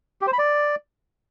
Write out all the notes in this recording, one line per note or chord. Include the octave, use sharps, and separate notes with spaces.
G4
C5
B5
D5